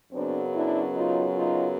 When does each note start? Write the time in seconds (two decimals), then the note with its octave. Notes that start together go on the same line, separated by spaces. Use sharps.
0.13 F#2 C#3 F#3 B3 C4 D4
0.54 D4 E4
0.95 D#4 F4
1.37 D#4 F4